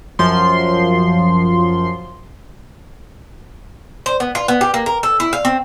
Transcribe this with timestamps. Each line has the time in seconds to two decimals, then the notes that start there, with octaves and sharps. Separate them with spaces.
0.19 F#2 F3 C6
4.06 C5
4.20 B3
4.35 F4
4.48 B3
4.61 G4
4.74 A#3
4.86 A#4
5.03 A4
5.20 E4
5.33 F5
5.45 C4